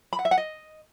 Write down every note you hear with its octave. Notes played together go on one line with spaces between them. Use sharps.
B5
F#5
E5
F#5
D#5